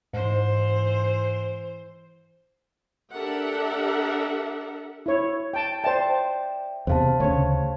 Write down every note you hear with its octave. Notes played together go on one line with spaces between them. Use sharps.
G#2 E3 C5
D4 G4 A4 A#4 E5 F#5
E4 C#5
G5 A5
C5 D5 E5 G5 A5
E2 C3 C5 F5 A5
D2 C#3 C#5